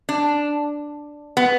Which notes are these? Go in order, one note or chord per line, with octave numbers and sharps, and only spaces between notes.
D4
B3